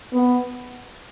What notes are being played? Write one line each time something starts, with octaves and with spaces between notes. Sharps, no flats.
B3